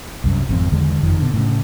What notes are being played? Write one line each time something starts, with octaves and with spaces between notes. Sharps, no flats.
C2 F#2
G#1 F2 C4
E2 D3 D#3 G#3
F#1 F2 D#3 F3
B2 D3
A2 C#3